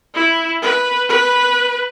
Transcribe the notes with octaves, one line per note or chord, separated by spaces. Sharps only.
E4
B4
B4